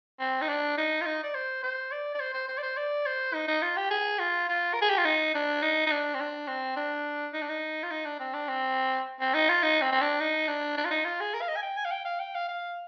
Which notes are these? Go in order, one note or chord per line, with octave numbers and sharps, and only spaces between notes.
C4
D#4
D4
D#4
F4
D#4
D5
C5
C5
D5
D5
C5
C5
C5
D5
C5
D5
C5
D#4
D#4
F4
G4
G#4
F4
F4
A#4
G#4
G4
F4
D#4
D4
D#4
D#4
D4
C4
D4
C4
D4
D#4
D4
D#4
F4
D#4
D4
C4
D4
C4
C4
D#4
F4
D#4
C4
C4
D4
D#4
D4
D4
F4
D#4
F4
G#4
A#4
F5
D#5
G#5
G5
G#5
F5
G5
F5
G5
F5
F5